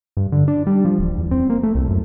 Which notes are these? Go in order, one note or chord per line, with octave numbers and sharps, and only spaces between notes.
G2
D3
D4
G3
F3
D1
E2
C4
A#3
A3
C2
F#2